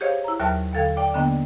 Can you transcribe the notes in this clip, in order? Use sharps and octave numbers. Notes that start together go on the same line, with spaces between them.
G4 G#4 C5 C#5 D#5 F5
E4 A#5
D#2 F#3 A#4 E5 A5 F6
D#2 D3 A4 F5 G#6
D5 G5 D6
D3 A#3 B3 D4 D#5 G5